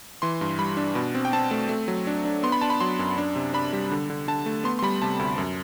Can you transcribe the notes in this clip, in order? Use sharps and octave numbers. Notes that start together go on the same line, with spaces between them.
E3 C6
G2
G3 B5
D4
B2
C4
G5
C4 A5
A3
A3
F#3
D4
D4
B3 C6
B5
D4 A5
B5
F#3 C6
F#2
D4
C3
D4 B5
G3
D3
D3
D3 A5
A3
B3 C6
C6
G3 B5
C3 A5
D2
F#2